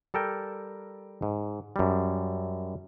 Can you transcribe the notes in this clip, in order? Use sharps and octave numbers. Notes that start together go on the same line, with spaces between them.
G3 A4 A#4 G5
G#2
F#2 G3